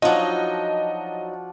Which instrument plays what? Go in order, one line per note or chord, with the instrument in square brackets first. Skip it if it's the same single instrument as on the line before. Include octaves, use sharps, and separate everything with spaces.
[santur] F3 D4 F#4 [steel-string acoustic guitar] F#3 D#4 [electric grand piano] D#5